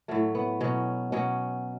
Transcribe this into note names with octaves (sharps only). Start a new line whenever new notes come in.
A2 F#3 A3
B3
B2 F#3 C#4
B2 F#3 C#4